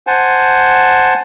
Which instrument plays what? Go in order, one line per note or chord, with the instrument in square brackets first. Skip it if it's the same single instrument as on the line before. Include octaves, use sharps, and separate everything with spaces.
[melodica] C5 F#5 G#5 A5